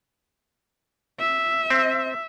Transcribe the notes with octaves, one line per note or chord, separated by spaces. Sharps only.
E5
C4